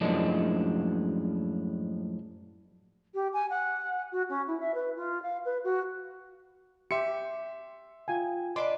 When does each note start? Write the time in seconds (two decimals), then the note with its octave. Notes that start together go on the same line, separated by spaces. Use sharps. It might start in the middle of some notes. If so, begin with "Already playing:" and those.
0.01 F#2 A2 F3 G#3 A#3 D4
3.14 G4
3.33 G#5
3.49 F#5
4.11 F#4
4.29 C#4
4.47 E4
4.59 E5
4.74 B4
4.96 F4
5.22 F5
5.45 B4
5.64 F#4
6.91 G4 E5 C6 C#7
8.08 F4 F5 G5 G#5
8.56 D4 B4 D5 D#5 C6 D6